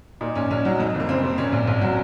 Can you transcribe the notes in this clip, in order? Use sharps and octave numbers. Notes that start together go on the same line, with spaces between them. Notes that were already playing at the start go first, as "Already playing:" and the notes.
A#2 D#4
A#1 C#4
A#1 C#4
F#3 D#4
F2 D#4
F#1
A#3
F#1 C4
C3
A#2 C#4
A#1
A#1
F#3